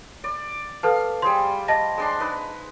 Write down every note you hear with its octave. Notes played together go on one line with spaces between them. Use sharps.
D5
A4 B4 F5 A5
G3 G#4 C5 C6
D#5 A5 A#6
G#3 D4 C6
D#4 B4